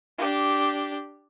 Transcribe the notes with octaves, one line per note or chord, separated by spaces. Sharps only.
D4 G4